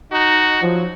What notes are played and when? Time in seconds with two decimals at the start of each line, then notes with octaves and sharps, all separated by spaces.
0.12 D#4 F#4
0.62 F3 F#3